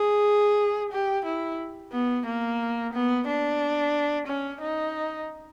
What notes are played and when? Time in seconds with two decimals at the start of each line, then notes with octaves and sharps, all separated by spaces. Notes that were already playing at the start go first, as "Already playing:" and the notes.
Already playing: G#4
0.92 G4
1.25 E4
1.92 B3
2.26 A#3
2.93 B3
3.27 D4
4.27 C#4
4.61 D#4